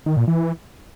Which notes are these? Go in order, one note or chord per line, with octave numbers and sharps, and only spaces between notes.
D#3
A#2
E3